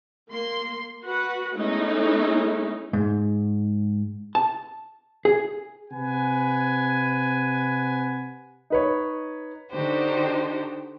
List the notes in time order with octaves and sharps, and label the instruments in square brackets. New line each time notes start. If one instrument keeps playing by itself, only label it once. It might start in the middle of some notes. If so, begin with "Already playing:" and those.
[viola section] A#3 C6
F#4 B4 F#5
G#3 A3 B3 C#4 D#4 E4
[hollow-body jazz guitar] G#2
A5
G#4
[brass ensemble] C3 B4 F#5 G#5
[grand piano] D#4 B4 C#5
[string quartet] D3 D4 D#4 F#4 G4 C5